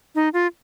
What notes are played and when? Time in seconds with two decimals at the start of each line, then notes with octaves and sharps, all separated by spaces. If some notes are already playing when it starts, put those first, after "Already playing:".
0.15 D#4
0.33 F4